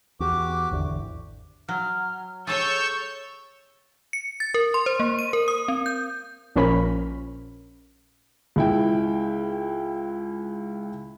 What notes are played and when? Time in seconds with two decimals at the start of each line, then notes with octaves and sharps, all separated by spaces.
0.20 E2 F#4 G4 D6
0.71 G#1 E2 D3
1.69 F#3 F6
2.47 G#4 A4 C#5 C#6 E6 G6 A6
4.13 C#7
4.40 A6
4.54 A#4
4.74 C6
4.86 C5
5.00 A#3
5.19 D#7
5.33 A#4
5.48 D#6
5.68 C4
5.86 G6
6.56 A#1 F3 C#4 A#4 B5
8.56 C#2 E4 G5